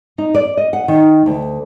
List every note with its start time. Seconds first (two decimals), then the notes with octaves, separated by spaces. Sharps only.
0.18 D#4
0.35 D5
0.57 D#5
0.73 F#5
0.88 D#3
1.26 D2